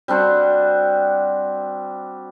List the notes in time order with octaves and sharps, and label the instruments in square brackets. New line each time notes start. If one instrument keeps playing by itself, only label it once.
[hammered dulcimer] G3 C4 D4 F#4